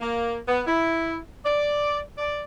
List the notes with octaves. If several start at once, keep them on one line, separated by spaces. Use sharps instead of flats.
A#3
B3
E4
D5
D5